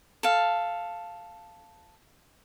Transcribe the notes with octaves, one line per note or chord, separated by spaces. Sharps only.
A4 F5